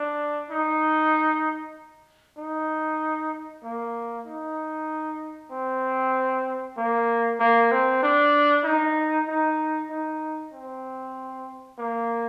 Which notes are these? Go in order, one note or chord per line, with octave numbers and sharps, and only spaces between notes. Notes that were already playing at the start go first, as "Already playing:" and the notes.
Already playing: D4
D#4
D#4
A#3
D#4
C4
A#3
A#3
C4
D4
D#4
D#4
D#4
C4
A#3